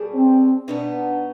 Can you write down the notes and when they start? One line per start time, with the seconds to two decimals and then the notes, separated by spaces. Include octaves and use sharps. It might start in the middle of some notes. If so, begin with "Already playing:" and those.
Already playing: B2 G3 D4 G#4
0.14 C4
0.68 B2 B3 D4 D#4